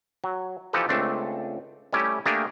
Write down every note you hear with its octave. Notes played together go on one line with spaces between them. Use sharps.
F#3
E3 F3 D#4 G4 A4 B4
C#2 A3 C4 D4
G3 A3 C#4 E4 G4
A3 A#3 D4 G4 G#4 A#4